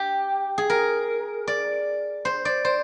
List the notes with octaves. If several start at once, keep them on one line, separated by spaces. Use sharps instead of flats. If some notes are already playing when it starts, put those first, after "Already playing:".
Already playing: G4
G#4
A#4
D5
C5
D5
C5